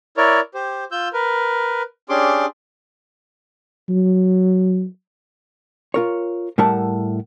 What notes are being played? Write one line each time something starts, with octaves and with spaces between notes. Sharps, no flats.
E4 A#4 C#5 D5
G4 C5
F4 E6 G6
A#4 B4
C#4 D4 G4 G#4 C6 D6
F#3
F4 A#4 C#5
A2 G3 A#4 E5 F#5 A5